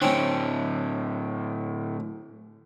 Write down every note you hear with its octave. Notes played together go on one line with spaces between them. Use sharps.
A2 D3 C4 C#4